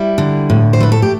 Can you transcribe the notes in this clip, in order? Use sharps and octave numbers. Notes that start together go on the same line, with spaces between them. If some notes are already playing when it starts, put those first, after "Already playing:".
Already playing: G3 E4
D3
A2
C5
A3 B4
A4
G4